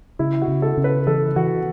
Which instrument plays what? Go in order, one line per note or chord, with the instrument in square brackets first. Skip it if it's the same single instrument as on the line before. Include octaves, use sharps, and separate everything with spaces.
[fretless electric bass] C#3 [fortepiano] E4
[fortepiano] F#4
[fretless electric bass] C#3
[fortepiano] A4
[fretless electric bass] C#3
[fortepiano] B4
[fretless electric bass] E3 [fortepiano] A4
[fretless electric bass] E3 [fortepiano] F#4